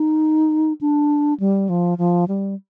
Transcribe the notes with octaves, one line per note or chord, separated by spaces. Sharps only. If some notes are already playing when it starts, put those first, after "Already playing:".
Already playing: D#4
D4
G3
F3
F3
G3